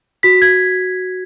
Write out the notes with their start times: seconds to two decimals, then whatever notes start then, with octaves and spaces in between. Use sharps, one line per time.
0.23 F#4 B6
0.42 G#6